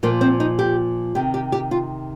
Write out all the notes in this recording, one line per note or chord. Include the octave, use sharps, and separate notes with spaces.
A#2 F3 A#3
C4
D#4
G4
C3 D#3 G4
G4
G4
F4